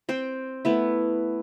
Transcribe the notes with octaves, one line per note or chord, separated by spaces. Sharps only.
C4 C5 G5
A3 B3 E4